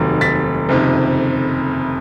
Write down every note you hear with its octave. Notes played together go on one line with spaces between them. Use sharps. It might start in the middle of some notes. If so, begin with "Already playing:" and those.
Already playing: F1 D#2 D#3 F#3
A6 B6
F#1 F2 C3 D#3